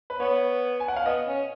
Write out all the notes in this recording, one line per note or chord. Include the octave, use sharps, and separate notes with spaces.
B4
B3 C#5
G#5
F#5
F5
B3 D#5
C#4